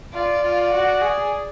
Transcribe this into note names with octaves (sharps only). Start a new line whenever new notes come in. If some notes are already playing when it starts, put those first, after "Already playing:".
F4 D5
F4
F#4
G#4